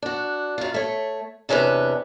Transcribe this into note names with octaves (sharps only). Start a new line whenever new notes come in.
D4 F#4
F#2 F4
A3 C#5
E2 C3 C#4 D4 G4 B4